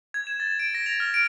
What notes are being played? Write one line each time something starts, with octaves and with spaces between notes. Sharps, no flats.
G#6
E7
A6
D7
A#6
F7
F6
D7